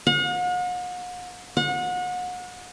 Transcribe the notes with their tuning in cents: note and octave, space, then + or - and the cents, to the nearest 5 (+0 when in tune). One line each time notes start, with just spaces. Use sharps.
F#5 -45
F#5 -35